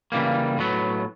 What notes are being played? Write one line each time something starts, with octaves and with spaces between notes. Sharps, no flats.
C#3 E3 G3 A#3
A2 F#3 B3